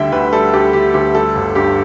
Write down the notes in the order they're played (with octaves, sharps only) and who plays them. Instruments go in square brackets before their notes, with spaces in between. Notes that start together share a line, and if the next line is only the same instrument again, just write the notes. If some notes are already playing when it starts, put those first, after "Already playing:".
Already playing: [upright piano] D2 D3 G3 E5 G5
D2 B4
G3 A4
D2 G4
D3 G4
D2 G4
G3 A4
G1
G2 G4